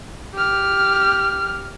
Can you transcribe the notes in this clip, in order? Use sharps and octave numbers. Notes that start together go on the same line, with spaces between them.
G4 F6